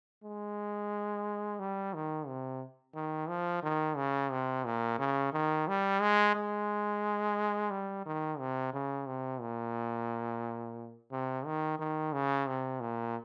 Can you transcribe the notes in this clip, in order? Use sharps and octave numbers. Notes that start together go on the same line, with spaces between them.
G#3
G3
D#3
C3
D#3
F3
D#3
C#3
C3
A#2
C#3
D#3
G3
G#3
G#3
G3
D#3
C3
C#3
C3
A#2
C3
D#3
D#3
C#3
C3
A#2